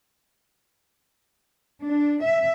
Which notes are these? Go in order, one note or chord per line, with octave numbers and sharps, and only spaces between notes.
D4
E5